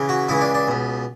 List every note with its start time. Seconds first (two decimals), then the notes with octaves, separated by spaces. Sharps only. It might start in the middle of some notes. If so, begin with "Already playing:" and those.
Already playing: C#3 E3
0.09 F#4
0.28 C#2 C#3 E3 E4
0.41 D4
0.54 D4
0.68 C#2 B2